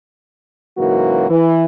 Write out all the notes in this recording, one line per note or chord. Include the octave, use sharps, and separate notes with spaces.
G#2 C#3 E3 F#3 A#3 F#4
E3